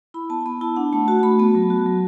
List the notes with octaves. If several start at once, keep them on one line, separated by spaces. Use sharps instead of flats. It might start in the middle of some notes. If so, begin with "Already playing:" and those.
E4 B5
B3 A5
B3 B5
E4 A5
D4 F#5
A3 A5
F#4 A5
A3 B5
B3 A5
F#3
F#4
F#3